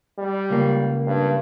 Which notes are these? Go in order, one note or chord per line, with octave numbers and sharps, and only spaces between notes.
G3
C#2 A#3
G2